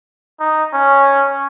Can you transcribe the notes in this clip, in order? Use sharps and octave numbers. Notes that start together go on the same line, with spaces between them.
D#4
C#4